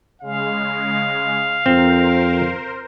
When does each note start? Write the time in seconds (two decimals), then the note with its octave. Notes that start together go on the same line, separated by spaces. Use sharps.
0.21 C#3 G#3 F5
1.66 F2 C4 A#4 C5